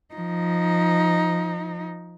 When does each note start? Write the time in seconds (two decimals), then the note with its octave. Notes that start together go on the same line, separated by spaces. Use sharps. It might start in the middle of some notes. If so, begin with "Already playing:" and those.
0.14 F3 D#4